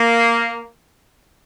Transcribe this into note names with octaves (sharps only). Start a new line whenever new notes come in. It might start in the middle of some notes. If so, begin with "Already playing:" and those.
Already playing: A#3